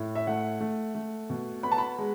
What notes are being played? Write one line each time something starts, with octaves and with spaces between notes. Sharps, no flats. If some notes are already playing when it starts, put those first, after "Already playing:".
Already playing: A2
E5
A3 F#5
A3
A3
B2
B3 B5
A5
B5
G#3